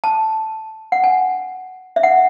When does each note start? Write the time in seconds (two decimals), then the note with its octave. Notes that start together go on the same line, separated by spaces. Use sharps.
0.04 A5
0.92 F#5
1.04 G#5
1.96 E5
2.03 F#5